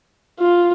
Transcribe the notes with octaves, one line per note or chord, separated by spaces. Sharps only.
F4